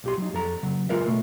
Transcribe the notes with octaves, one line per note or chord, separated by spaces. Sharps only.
B1 G4 C6
F#3 D#4
F2 A4 A#5
C#3 F#3
G#3 F4 A#4 B4 E5
B2 A3